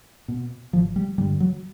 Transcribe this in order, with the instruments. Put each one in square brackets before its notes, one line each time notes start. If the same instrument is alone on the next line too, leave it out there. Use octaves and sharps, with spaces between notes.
[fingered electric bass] B2
G#1 F3
G3
G2 D3 G3
F#3